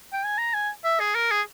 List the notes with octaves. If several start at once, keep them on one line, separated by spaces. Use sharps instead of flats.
G5
G#5
A#5
G#5
E5
G#4
A#4
G#4